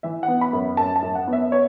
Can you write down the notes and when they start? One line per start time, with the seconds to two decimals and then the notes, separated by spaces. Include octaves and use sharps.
0.03 E3 E5
0.23 F#5
0.28 B3
0.41 B5
0.53 F#2
0.77 F#2 A5
0.96 A5
1.02 F#2
1.15 F#5
1.27 B3
1.33 E5
1.52 C#5